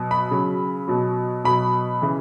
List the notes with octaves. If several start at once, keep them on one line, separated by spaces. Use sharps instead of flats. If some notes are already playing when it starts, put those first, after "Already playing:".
Already playing: B2 F#3
B5
C#3 F#3
B2 F#3
B2 F#3 B5
C#3 E3